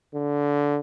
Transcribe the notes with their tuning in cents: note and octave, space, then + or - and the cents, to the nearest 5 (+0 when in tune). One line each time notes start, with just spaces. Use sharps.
D3 -20